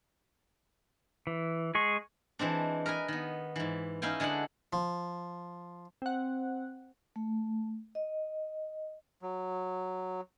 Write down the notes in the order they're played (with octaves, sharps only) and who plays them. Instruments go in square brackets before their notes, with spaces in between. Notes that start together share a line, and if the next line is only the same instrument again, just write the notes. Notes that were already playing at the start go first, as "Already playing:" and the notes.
[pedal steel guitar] E3
G#3 G#4 C#6
[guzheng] E3 G#3 C4 D4
A#4 B4 D#5 G#5
D#3 B3
G#2 E3
C#4 D#4 E4 F5 G5 G#5
D3 G#3 G#4 A4 F#5
[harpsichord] F3
[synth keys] C4 F#5
[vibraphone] A3
D#5
[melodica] F#3